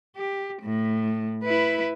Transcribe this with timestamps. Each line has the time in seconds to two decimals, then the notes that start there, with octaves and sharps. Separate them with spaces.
0.16 G4
0.63 A2
1.44 E4 B4